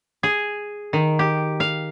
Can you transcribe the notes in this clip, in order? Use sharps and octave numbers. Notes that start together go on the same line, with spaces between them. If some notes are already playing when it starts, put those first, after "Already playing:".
G#4
D#3
G4
F5